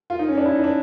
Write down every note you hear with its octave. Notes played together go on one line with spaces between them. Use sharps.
F4
D#4
C#4
D4
E4
D#4
D4